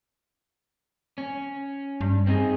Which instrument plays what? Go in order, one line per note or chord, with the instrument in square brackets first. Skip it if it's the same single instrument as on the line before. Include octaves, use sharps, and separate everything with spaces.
[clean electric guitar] C#4
[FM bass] G2
[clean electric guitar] C4 D#4 G#4